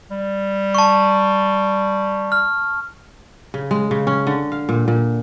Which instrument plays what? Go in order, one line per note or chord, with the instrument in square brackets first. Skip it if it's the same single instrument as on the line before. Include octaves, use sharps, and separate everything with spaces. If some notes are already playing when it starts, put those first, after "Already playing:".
[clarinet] G3
[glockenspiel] A5 C#6
F6
[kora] C#3
G#3
C#3
C#4
D3
F5
A#2
A#2